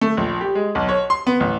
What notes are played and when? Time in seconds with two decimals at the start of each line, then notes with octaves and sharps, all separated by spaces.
0.01 A3
0.17 A#1
0.41 G4
0.55 G#3
0.75 B1
0.89 C#5
1.10 C6
1.27 B3
1.40 A1